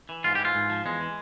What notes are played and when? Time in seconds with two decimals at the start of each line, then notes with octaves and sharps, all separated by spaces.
0.09 E3
0.24 G#2 F4
0.35 G4
0.40 E3
0.45 F4
0.55 G#2
0.70 F3
0.86 E2 G#3
1.01 E3